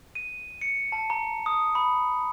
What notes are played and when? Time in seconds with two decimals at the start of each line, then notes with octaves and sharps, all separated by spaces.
0.15 D#7
0.61 C#7
0.92 A5
1.10 A#5
1.46 D#6
1.75 B5